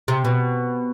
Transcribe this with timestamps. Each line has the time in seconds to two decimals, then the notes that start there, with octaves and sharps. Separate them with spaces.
0.08 C3
0.25 B2